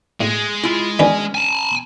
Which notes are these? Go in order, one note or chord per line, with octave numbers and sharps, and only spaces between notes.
A2 G#3
E4 F4
D#3 C#4 D4 B4
G#5 A5